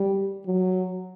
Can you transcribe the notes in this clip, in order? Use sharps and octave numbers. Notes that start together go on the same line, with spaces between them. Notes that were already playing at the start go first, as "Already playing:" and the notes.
Already playing: G3
F#3